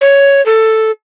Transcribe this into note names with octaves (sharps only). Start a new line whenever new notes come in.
C#5
A4